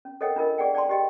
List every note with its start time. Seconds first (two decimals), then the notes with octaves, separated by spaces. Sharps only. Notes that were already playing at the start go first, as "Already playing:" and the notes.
0.05 C#4
0.21 A4 A#4 C#5 D#5 F#5 G5
0.36 D4 F4 A#4 D#5
0.58 G#4 D5 F#5 G5
0.75 D5 G5 A5 C6
0.89 G4 D#5 G5